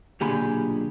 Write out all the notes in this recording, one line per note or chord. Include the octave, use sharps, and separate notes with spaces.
B1 A#2 D3 G4 G#4 B5